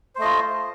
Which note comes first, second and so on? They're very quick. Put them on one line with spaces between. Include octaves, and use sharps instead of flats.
C5 A3 D#5 F4